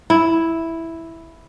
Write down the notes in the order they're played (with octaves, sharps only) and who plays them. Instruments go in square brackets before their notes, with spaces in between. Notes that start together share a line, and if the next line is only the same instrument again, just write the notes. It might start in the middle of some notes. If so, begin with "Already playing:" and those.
[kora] E4